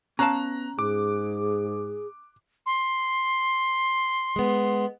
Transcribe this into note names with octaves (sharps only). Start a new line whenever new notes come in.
B3 C#4 F5 A5 A#5 F#6
G#2 G#4 D6
C6
G#3 B3